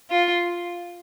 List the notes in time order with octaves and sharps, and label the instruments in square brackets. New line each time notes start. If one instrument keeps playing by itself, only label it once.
[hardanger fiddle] F4